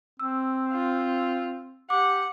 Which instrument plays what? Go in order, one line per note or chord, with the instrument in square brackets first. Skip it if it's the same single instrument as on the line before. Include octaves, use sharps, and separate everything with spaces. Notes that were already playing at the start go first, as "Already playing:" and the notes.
[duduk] C4 [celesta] E6
[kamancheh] F4
[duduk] G4 [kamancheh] F#5 [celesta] D6